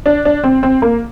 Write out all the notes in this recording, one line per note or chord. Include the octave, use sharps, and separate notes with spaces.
D4
D4
C4
C4
A#3